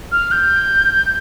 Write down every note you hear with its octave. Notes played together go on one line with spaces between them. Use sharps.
F6
G6